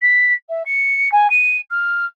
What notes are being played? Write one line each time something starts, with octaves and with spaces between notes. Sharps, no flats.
B6
E5
C#7
G#5
D#7
F6